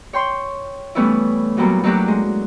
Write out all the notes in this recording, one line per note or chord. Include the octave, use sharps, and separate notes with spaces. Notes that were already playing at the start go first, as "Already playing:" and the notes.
C#5 G5 C6
E3 G3 A3 B3 C#4 E4
A#2 F#3 G3 A#3 B3
F#3 A3 A#3 D4 F#4 G4
G#3